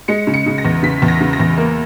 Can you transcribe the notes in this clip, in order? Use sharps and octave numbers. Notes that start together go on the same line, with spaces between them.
G#3 C#7
C#3
C#7
C#3
A#6
E2
C#3 B6
E2
A#6
C#3
A#6
E2
A#3